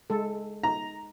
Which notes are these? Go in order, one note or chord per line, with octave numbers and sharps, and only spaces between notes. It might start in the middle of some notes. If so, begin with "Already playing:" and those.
G#3 A4
D#4 A#5